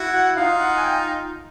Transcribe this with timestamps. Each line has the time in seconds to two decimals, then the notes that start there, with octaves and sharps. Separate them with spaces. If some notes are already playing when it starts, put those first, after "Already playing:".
Already playing: E4 F#4
0.14 F#5
0.36 D#4 F4 F5
0.60 F#5
0.77 G#5
0.82 G5